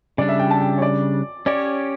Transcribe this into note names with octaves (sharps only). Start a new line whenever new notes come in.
C#3 G3 D4 D5
E5
G5
A5
G5
C#5
D5
C#4 G4 C#5 D5